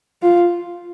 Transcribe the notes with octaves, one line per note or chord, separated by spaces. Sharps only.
F4